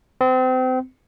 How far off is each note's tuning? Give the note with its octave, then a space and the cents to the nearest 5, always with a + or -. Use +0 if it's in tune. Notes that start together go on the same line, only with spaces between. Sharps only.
C4 -30